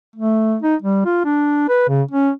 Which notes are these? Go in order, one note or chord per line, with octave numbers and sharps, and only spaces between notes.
A3
D#4
G3
F4
D4
B4
C#3
C#4